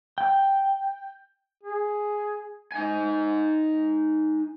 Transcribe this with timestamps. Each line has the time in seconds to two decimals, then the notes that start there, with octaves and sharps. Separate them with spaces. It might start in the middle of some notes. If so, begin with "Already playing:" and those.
0.18 G5
1.63 G#4
2.72 D#4 G#5